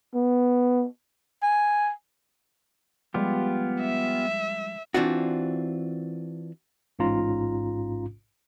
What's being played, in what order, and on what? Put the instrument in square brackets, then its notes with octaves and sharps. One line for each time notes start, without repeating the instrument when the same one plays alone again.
[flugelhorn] B3
[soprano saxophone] G#5
[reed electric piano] F3 G3 G#3 [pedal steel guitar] B3 F4 G4
[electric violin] E5
[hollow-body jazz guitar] E3 C4 D4 F4 F#4
[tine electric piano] A1 G#2 C#4 F4 A#5